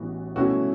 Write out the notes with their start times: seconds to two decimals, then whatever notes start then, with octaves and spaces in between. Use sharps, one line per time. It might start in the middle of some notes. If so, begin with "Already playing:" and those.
Already playing: A1 A2 E3 B3 F#4
0.36 B2 A3 C#4 E4 F#4